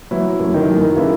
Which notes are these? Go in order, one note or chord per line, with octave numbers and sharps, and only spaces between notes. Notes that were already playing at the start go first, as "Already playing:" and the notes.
E3 F#3 E4
F#2
D#3 D#4
F#2
C#3 E3 E4